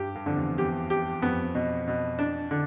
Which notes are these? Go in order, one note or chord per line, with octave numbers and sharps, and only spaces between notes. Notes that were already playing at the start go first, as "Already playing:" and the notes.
Already playing: G2 G4
G2
F2 D3
E2
E2 G4
G4
F2 B3
B2
B2
D4
D3